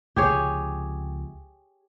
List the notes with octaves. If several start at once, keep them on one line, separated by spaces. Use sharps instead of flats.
C#2 C3 F3 G4 G#4 C#5